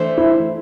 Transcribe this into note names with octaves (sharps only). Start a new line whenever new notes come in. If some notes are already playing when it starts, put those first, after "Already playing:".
Already playing: E3 A3 D4 A4 C5
E4